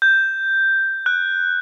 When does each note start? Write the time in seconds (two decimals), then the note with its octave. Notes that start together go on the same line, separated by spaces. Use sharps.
0.02 G6
1.06 F#6